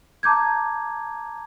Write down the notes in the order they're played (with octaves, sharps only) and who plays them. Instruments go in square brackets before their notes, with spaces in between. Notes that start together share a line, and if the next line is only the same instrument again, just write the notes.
[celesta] A5 A#5 D6 G6 G#6